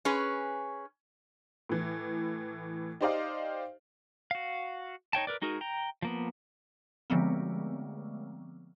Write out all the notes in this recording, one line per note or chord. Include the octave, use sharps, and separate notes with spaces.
C#4 G#4 B4
A2 E3
D#4 G4 C5 D5 D#5 F5
F#4 F5
D#4 C#5 G5 A5
A#4 B4 D5
G#3 D#4 F#4 G#4 A#4
G5 A#5
F3 A#3 B3
D3 F3 G#3 A3 B3 C4